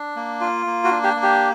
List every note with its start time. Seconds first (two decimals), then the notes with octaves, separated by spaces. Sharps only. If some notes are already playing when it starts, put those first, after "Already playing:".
Already playing: D4
0.16 A#3
0.41 F4
0.66 A#3
0.85 F#4
0.91 D4
1.04 G4
1.16 A#3
1.23 G4